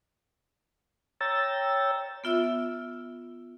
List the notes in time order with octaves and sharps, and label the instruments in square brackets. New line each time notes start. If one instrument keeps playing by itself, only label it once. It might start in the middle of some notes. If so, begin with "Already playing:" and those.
[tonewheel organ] C#5 G5 A#5 E6 A6
[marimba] B3 F4 E5 E6